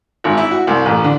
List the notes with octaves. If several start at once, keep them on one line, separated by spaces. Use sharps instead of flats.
G#1
E4
F#4
C2
A1
D3